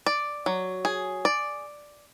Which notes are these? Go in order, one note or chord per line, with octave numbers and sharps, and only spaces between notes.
D5
F#3
G#4
D5